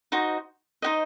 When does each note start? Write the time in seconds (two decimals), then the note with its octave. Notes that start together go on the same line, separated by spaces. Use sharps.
0.12 D#4 F#4 C5 D#5
0.82 D#4 F#4 C5 D#5